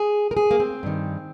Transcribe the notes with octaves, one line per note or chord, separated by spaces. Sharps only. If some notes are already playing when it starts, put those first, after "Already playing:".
Already playing: G#4
A#4
G#4
A#3
C4
G2 D#3